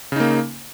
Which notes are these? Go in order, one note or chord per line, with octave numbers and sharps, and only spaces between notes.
C#3 A#3 D#4